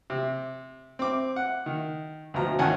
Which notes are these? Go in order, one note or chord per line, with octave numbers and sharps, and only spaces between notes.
C3
C4 D6
F#5
D#3
D2 B2 F3 A#5
G#1 D#3 C#4 F#5 G#5 A5